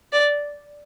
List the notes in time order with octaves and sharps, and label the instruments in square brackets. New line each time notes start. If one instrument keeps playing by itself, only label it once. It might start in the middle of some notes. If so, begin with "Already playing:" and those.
[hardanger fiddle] D5